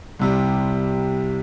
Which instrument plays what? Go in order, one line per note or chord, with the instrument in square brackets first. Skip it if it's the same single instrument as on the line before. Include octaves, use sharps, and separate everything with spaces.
[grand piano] C2 C3 G3